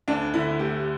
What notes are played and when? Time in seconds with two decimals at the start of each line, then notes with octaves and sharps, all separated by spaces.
0.08 D2 D4
0.34 D3 E4
0.59 A3 G4